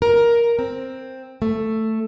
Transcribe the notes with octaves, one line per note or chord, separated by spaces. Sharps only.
A#4
C4
A3